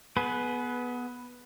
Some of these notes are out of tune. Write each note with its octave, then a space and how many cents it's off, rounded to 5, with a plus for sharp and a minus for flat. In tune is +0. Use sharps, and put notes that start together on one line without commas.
B3 -10 G#4 +30 B4 +0